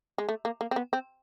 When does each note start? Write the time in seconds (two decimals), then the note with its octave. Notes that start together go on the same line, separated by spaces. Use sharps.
0.18 G#3
0.29 A3
0.45 A#3
0.61 A#3
0.71 C4
0.76 B3
0.93 C4